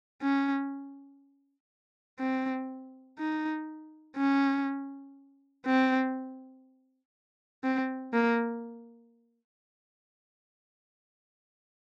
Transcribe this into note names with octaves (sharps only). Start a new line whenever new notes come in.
C#4
C4
D#4
C#4
C4
C4
A#3